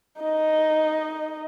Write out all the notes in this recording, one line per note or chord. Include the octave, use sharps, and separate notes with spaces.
D#4 D#5